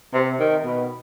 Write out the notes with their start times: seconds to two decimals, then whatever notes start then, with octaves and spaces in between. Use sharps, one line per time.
0.14 C3
0.40 D#3
0.65 B2